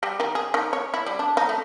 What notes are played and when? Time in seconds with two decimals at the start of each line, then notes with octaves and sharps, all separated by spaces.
0.03 G3
0.20 D#3
0.35 G#4
0.54 D#3
0.73 C#5
0.94 E4
1.06 G3
1.19 D4
1.37 D#4
1.49 A3